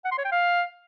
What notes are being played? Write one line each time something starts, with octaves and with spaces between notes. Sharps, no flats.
F#5
C6
C#5
G5
F5